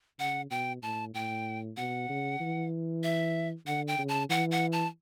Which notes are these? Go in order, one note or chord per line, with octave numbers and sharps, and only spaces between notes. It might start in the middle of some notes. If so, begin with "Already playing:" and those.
C#3 F#5
B2 G5
A2 A5
A2 G5
B2 F#5
C#3
E3
E5
D3 F#5
G5
C#3
A5
E3 F#5
F#5
A5